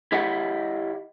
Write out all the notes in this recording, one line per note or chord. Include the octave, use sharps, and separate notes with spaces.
E4 G4 D#5 E5 F#5